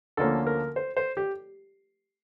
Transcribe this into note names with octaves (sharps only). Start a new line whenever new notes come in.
D2 D3 F3 A#3 C#4 A4
A#4
C5
C5
G4